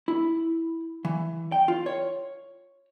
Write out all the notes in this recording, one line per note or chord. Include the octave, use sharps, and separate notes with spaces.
E4
E3
G5
F4
C#5